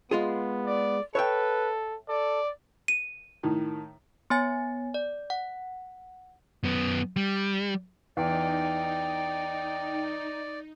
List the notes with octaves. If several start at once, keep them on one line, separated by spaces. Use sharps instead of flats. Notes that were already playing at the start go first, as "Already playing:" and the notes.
G#3 B3 F4 G#4
D5
A4 B4 C#5 E5 G5
A4 D5
D#7
A2 D#3
B3 C#5 G#5 A6
D5
F#5
F#2 B3
G3
E2 D#4 D5 G5